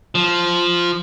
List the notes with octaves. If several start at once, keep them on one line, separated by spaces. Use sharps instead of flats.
F3